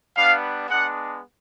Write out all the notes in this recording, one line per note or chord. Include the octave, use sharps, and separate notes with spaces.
G3 B3 D4 F5
G#3 B3 D4 F#5